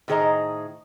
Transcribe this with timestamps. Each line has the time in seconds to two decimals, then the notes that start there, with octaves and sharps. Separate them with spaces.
0.08 A2 D#3 G#4 C5 D#5 A#5